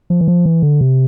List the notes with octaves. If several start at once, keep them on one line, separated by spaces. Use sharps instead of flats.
F3
E3
F3
E3
D3
C3